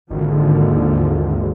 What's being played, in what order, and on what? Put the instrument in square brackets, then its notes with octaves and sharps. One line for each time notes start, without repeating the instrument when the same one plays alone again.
[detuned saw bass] G#1 [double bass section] D#2 D3 F3